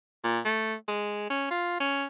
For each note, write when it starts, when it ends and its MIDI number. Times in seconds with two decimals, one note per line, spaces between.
0.24 0.40 46
0.45 0.75 57
0.88 1.29 56
1.30 1.49 61
1.51 1.80 65
1.80 2.06 61